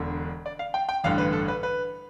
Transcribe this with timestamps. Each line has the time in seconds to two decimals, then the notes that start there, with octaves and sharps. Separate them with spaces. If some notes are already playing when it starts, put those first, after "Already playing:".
Already playing: E1 E2 D3
0.46 D5
0.59 F5
0.74 G5
0.89 G5
1.04 A1 G2 D3 F5
1.18 B4
1.33 A4
1.48 B4
1.63 B4